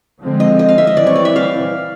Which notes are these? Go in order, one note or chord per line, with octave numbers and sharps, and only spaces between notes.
D3 F3 G#3 C4
D#5
D#5
F5
E5
D#5
E3 G3 C4 D5
C#5
D5
E5
F5